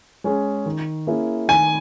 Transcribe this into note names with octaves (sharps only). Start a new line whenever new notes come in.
G#3 C#4 G#4
D#3
A#3 C#4 E4 G#4
D#3 G#5